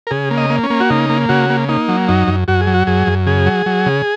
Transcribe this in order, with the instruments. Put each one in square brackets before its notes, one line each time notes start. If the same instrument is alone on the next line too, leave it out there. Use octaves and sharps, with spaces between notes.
[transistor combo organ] A#4
C#3 G#4
A#3
D#5
A#3
C#4
A#3
F#4
C#3 D#4
A#3
C#3 F#4
A#3
A#3 D#4
F#3
F#2 D#4
F#2
F#2 F#4
G#4
F#3
F#4
F#2 G#4
F#2
C#3 G#4
F#3
F#3
C#3